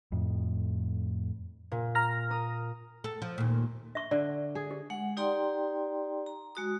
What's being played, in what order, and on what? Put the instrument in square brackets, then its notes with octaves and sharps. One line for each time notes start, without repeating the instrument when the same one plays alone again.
[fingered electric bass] F2 A2
[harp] A#2
[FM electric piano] A#5 F6 A#6
[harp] A#4 D#6
[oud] A4
F3
D#2 A#2
[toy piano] E5 C#6
[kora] D3 [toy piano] D5
[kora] G#4
[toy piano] G4
[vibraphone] G#3 F#5
D#4 G4 D5 G5 A#5 C6
A#5
G#3 F#4 D#6